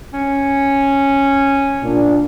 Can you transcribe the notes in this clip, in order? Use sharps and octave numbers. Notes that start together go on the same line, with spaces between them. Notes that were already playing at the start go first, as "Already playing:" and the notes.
C#4
A#2 D4